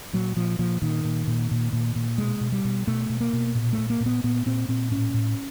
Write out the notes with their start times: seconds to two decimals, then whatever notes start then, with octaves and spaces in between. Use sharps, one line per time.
0.13 A#2 F#3
0.37 A#2 F3
0.59 A#2 F3
0.82 A#2 D#3
1.04 A#2
1.27 A#2
1.51 A#2
1.73 A#2
1.95 A#2
2.18 B2 G#3
2.41 B2
2.52 G3
2.65 B2
2.87 B2 A3
3.09 B2
3.21 A#3
3.33 B2
3.55 A#2
3.73 A#2 A3
3.90 A#3
4.00 A#2
4.06 B3
4.24 A#2 B3
4.46 A#2 C4
4.68 A#2 C4
4.91 A2 C#4
5.14 A2